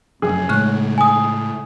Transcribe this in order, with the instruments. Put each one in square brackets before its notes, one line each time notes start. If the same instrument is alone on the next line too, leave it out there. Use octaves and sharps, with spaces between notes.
[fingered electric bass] F1 F#2 [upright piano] G#4
[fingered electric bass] A2 G#3 [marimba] C#3 C#6 F#6
[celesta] G#5 D#6